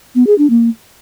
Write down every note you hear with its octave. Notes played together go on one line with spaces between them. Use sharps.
B3
G#4
D4
A#3